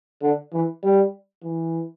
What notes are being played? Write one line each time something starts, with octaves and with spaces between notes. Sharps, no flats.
D3
E3
G3
E3